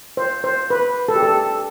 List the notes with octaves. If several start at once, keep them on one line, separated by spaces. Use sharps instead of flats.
C5
C5
B4
A4
G4
A4